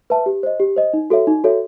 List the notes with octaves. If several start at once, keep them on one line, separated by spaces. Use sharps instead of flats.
B4 E5 A5
G4
C5 D#5
G4
C5 D#5
D#4
F#4 A4 C#5 E5
D#4
F#4 A4 C#5 E5